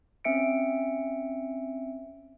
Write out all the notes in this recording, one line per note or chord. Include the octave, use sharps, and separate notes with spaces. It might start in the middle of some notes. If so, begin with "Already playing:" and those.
C4 C#4 E5 C#7 D7